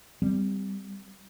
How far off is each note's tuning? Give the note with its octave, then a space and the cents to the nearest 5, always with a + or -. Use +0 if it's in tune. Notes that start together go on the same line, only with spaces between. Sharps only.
G3 +0 C4 -30